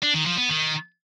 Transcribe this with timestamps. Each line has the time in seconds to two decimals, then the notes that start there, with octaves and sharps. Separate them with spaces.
0.03 D4
0.14 D#3
0.26 F3
0.37 B3
0.49 D#3